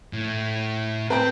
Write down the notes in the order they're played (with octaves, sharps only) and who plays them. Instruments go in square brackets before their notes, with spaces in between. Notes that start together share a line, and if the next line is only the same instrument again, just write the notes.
[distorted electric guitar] A2
[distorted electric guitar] C4 [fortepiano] B4 G5